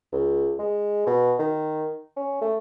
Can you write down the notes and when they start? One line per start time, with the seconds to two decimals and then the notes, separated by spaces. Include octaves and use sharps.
0.13 C#2
0.59 G#3
1.07 B2
1.40 D#3
2.17 C#4
2.42 A3